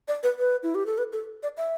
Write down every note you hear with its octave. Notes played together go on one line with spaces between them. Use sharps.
D5
B4
B4
E4
G4
A4
B4
A4
D5
E5